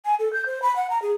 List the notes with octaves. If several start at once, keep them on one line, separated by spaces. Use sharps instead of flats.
G#5
A4
G6
C5
B5
F#5
A#5
G#4